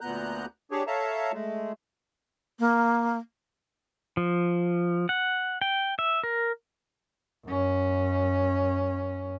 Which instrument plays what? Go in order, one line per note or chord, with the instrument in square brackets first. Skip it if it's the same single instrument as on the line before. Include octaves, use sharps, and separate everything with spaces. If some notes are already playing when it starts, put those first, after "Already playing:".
[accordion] D2 A#2 B3 A#5 F#6 G6
D4 G4 G#4 C#5
A4 C#5 E5 F5 A5 A#5
G#3 A3
[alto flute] A#3
[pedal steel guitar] F3
F#5
G5
E5
A#4
[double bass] F#2 C#4